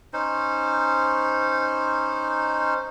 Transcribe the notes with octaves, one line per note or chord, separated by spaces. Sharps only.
C#4 D#4 C5